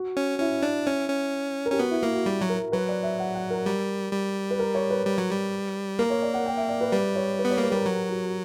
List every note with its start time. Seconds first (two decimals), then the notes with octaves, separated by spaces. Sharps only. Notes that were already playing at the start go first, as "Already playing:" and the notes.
Already playing: F#4
0.17 C#4
0.39 C#4 E4
0.63 D4
0.87 C#4
1.10 C#4
1.66 A#4
1.71 C#4 G4
1.79 B3 F#4
1.91 E4
2.03 A#3 E4
2.14 F#4
2.26 G3 F#4
2.42 F#3
2.49 A#4
2.72 F#3 B4
2.89 D5
3.03 E5
3.20 F#5
3.35 F#5
3.50 A#4
3.66 G3
4.13 G3
4.51 B4
4.59 A#4
4.75 C#5
4.90 B4
5.06 G3
5.18 F#3
5.31 G3
5.99 A#3 A#4
6.10 C#5
6.22 D5
6.34 F#5
6.46 G5
6.57 E5
6.69 D5
6.81 B4
6.92 G3 B4
7.16 C#5
7.39 B4
7.45 B3
7.51 C#5
7.58 A#3 B4
7.70 G3 G4 A#4
7.86 F#3 F#4
8.09 F#4